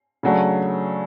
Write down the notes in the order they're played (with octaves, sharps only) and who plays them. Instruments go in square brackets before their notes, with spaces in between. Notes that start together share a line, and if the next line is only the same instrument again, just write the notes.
[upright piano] C#3 F#3 A3 D4